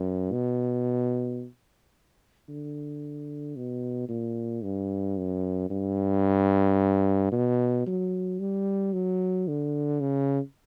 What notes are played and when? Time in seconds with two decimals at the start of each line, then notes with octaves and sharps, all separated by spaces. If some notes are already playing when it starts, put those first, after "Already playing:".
Already playing: F#2
0.32 B2
2.49 D3
3.56 B2
4.09 A#2
4.64 G2
5.18 F#2
5.70 G2
7.32 B2
7.87 F#3
8.40 G3
8.93 F#3
9.48 D3
10.01 C#3